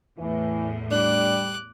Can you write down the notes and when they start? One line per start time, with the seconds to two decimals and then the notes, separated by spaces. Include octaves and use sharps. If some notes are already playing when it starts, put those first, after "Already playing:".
0.18 E2 A2 E3
0.91 G3 D4 D6 F#6